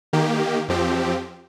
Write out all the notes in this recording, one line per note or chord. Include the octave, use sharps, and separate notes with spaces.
D#3 A#3 G4
F2 F3 C4 G4